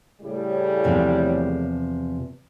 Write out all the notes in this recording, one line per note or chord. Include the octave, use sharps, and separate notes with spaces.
A2 C#3 G3
E2 C3 F3